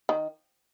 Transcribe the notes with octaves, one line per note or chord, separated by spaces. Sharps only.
D#3